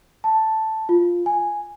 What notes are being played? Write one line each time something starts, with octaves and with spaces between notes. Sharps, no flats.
A5
F4
G#5